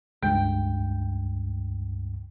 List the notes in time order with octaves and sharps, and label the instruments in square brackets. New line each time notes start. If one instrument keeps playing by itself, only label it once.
[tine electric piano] C#2 G2 [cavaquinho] G5